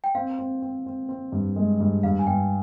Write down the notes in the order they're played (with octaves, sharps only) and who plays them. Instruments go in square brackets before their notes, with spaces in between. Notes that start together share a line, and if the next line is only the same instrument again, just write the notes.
[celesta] G5
[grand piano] C4 [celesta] F5
[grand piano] C4
C4
C4
C4
G2
G#3
G2
[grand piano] G2 [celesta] F5
[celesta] G#5
[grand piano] G2 [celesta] G5